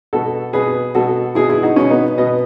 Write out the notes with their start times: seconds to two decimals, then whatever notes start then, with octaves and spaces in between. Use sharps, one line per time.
0.13 B2 F#4 A4
0.53 B2 G#4 B4
0.95 B2 F#4 A4
1.35 B2 E4 G#4
1.49 E4 G#4
1.63 D#4 F#4
1.76 B2 C#4
1.90 B3 D#4
2.18 B2 B4 D#5